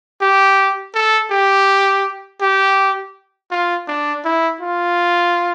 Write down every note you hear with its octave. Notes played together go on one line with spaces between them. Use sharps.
G4
A4
G4
G4
F4
D4
E4
F4